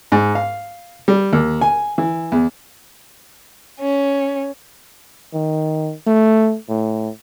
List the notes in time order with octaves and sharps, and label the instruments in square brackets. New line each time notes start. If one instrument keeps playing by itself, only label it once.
[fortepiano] G#2
F5
G3
D#2
G#5
E3
E2
[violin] C#4
[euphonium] D#3
A3
A2